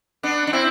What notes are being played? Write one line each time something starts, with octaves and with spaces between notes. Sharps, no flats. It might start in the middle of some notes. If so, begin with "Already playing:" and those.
B3 D4
D4
C4 E4